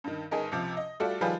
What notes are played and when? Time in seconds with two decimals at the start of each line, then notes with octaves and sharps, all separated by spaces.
0.04 G2 D#3
0.31 G1 D#4 G#4 A#4 D#5
0.51 C#2 C3 F3
0.77 D#5
1.00 G3 A3 F4 F#4 A4 D5
1.21 D#3 F3 G3 F4 G#4 B4